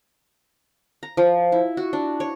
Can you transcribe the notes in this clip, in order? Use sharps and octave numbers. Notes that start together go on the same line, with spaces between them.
A#5
F3
E4
F#4
D4
C#5